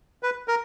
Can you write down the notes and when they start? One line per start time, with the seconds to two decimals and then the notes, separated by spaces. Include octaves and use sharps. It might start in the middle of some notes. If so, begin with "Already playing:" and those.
0.23 B4
0.48 A#4